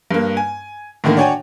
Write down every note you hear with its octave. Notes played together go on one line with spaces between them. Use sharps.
G2 A#3
G#5
A2 D3 D#3 A#3
D4 F#4 C#5 G5 G#5